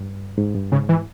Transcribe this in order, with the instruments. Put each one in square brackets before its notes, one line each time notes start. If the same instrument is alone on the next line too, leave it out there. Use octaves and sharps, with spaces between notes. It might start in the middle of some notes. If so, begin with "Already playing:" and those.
Already playing: [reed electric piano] G2
G#2
G2
[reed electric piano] G#2 [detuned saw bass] C#3
[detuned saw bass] E3